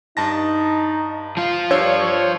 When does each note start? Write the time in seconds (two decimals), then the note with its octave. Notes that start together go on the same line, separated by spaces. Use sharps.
0.17 G2 D#4 A5 A#6
1.37 F3 F4
1.71 G2 D4 C#5 E6